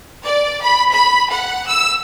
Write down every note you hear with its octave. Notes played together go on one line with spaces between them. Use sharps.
D5
B5
B5
F#5
E6